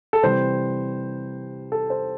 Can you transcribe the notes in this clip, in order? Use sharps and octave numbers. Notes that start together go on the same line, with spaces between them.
A4
C3 E3 G3 C5
A4
C5